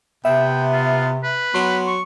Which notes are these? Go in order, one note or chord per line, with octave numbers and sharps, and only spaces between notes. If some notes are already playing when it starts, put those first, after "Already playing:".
C3 B3 E5 G5
F4
B4
F#3 B3 C6
C#6